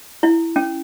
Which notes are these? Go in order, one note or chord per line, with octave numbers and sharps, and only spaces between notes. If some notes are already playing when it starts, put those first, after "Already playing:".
E4
C#4